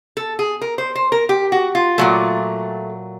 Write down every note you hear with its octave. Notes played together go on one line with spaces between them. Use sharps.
A4
G#4
A#4
C5
C5
A#4
G4
F#4
F4
A#2 F#3 A3